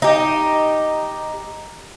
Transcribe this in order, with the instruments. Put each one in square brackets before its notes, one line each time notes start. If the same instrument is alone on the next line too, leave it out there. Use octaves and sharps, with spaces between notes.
[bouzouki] D#4 G4